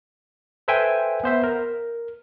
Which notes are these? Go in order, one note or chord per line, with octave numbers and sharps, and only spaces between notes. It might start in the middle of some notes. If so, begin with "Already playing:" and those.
A4 B4 C5 E5 G5 G#5
B3 C5 E5
A#4